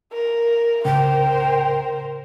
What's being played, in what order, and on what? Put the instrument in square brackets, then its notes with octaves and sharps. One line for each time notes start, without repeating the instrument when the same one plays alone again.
[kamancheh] A#4
[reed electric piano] C2 A2 C#3 [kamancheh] A#4 C5 [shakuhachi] G5